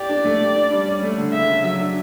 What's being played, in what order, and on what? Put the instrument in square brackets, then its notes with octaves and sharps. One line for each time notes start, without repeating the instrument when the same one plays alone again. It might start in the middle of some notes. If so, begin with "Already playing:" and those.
Already playing: [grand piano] G4 [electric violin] D5
[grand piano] D4
A3
G4
D4
G3
C#4
A3
D3
[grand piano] C#3 [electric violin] E5
[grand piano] C#4
F#3
D4